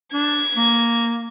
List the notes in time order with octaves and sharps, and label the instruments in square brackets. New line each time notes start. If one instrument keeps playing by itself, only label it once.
[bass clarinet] D4 [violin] G#6
[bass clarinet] A#3